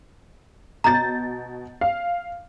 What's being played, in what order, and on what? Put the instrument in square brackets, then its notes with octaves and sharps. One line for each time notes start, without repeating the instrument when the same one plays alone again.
[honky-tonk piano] B2 G6 A6 [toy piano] A#5
[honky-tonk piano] F5